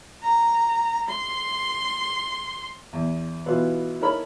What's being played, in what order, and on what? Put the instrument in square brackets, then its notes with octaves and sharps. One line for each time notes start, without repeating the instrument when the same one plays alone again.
[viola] A#5
C6
[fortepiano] E2
B2 E3 B3 E4 F4 B4
D#4 E4 A4 A#4 C#5 B5